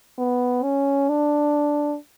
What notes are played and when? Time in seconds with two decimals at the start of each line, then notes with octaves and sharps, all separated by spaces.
0.18 B3
0.63 C#4
1.09 D4